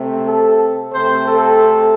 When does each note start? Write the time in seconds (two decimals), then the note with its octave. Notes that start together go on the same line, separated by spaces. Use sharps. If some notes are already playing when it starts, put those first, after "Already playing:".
Already playing: C3 A3 C4
0.27 A4
0.93 C3 A3 C4 C5
1.26 A4